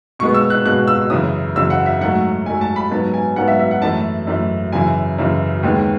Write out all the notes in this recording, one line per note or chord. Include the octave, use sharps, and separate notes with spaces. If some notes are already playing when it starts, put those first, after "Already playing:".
B2 G#3 B3 C#6
E6
F#6
B2 G#3 B3 F#6
E6
F#2 C#3 E3 D#6
F#2 C#3 E3 E6
F#5
E5
G#2 F#3 A3 F#5
G#2 F#3 A3 G#5
A5
B5
G#2 F#3 B3 A5
G#5
G#2 F#3 B3 F#5
E5
E5
F#5
F#2 E3 A3 A5
F#2 E3 A3
F#2 C#3 E3 G#5
F#2 C#3 E3
D#2 D#3 G#3 B3